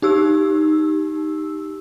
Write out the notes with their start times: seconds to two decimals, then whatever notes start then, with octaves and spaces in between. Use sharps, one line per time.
0.02 D#4 G4 E6